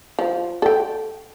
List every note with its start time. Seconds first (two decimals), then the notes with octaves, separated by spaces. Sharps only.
0.19 F3
0.62 A4 G5